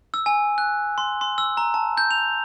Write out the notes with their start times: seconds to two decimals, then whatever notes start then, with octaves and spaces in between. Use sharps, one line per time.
0.14 E6
0.26 G#5
0.58 F#6
0.98 C6
1.21 C6
1.38 E6
1.57 A#5
1.74 A5
1.97 G6
2.11 F7